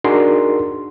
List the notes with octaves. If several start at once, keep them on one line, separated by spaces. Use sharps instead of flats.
D4 D#4 F#4 G#4 A#4 C6